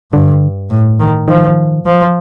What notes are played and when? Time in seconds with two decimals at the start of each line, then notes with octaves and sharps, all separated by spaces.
0.12 G2 D3
0.70 A2
1.00 D#3
1.28 D#3 F3
1.86 F3